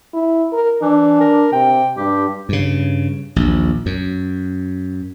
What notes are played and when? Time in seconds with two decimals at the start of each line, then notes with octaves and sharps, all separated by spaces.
0.14 E4
0.53 A#4
0.82 E3 D4
1.20 A#4
1.52 C3 G5
1.97 G2 G4
2.49 G2 C#3
3.36 A#1 D#2
3.86 F#2